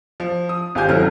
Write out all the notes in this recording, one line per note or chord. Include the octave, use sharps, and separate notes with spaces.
F3
D#6
G#1 F4 G4 C5 G#5 G6
G#1 C#3 F#3 E4 A4 F6